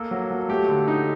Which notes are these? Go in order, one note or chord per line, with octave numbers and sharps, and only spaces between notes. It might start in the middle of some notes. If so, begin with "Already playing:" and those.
Already playing: A#3 A4
F#3
F#3
A3 G4
D3
D#4